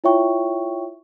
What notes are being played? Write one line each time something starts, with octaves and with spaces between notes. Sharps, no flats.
E4 F4 C#5 E5 G5 C#6